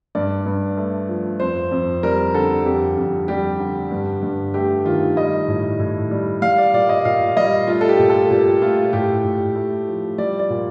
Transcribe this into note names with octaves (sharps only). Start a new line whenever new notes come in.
G2 D5
G2
A3
F3
F2 C5
F2
G3 A#4
D3 A4
F2 G4
F2
G3 G4
D3
G2
G2
A3 G4
D#3 F4
G3 D#5
A2
A2
G3
G3 F5
D5
A#2 D5
D#5
A#2 F5
G3 D#5
A3 F4
A4
G4
A#2
A4
A#2 G4
A3 F4
A2 G4
A2
A3
F3
G3 D5
D5
A#2